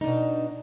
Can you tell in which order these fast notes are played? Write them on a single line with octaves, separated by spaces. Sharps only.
D#4 D4 B2